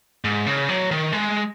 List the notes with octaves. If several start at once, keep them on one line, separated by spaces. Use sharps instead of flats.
G#2
C#3
F#3
D#3
G#3